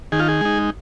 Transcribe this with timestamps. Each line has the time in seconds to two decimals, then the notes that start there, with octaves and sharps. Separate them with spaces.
0.12 D#3 G#4
0.20 F4
0.28 G#4
0.41 G#3 D#4